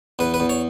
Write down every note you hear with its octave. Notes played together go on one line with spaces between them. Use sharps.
E2 B4
B4
E2
C#5